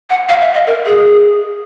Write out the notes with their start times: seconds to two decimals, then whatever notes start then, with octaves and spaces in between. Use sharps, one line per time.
0.10 F#5
0.29 F5
0.41 E5
0.54 D#5
0.67 A#4
0.86 G#4